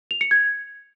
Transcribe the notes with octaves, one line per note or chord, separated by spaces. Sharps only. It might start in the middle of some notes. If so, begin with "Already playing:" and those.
F7
C#7
G#6